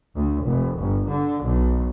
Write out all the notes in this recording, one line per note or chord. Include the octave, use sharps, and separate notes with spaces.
D2
F1
G1
D3
B1